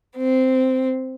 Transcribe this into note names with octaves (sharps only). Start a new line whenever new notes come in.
C4